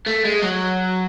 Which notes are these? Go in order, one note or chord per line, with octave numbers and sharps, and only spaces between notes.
A3
G#3
F#3